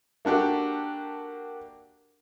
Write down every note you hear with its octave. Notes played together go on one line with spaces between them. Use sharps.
A#3 D4 F#4 G4 A4